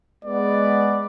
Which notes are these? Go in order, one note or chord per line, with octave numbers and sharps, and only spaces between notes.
G#3 B3 D5